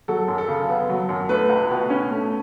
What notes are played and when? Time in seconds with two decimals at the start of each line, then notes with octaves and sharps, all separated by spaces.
0.08 F#3 A4
0.28 F#2
0.38 A4
0.48 C#3
0.69 B3
0.90 F#3
1.09 F#2
1.29 A3 B4
1.49 C#2
1.70 B2
1.90 C#4
2.11 A3